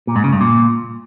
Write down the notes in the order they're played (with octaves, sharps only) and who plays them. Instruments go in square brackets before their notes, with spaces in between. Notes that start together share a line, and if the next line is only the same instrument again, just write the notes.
[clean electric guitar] A#2
G#2
C#3
G2
A#2